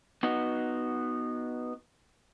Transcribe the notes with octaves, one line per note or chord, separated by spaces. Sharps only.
B3 D#4 F#4